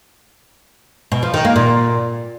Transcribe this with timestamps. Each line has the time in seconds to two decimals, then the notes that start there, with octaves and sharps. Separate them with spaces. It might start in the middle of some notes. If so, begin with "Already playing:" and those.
1.12 B2
1.23 F3
1.34 D#3
1.45 A#3
1.56 A#2